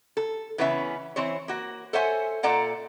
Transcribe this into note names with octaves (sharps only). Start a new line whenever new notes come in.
A4
C#3 E3 B3 C#4 D#4 E5
E3 C4 C5 C#5
A#3 F#4
A4 C5 C#5 E5 F#5 G#5
A#2 A4 D5 F#5 A#5